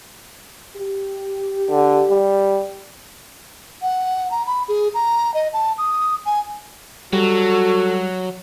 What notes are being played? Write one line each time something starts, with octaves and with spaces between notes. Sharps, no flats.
G4
D3
G3
F#5
A#5
B5
G#4
A#5
D#5
A5
D#6
G#5
F#3 G3 F#4 A4